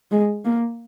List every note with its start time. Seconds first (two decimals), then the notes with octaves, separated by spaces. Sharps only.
0.12 G#3
0.45 A#3